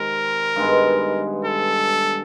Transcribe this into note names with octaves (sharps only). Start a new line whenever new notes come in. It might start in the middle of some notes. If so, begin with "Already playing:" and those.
Already playing: C3 D#3 G#3 A#4
G2 D#3 G#3 B3
A4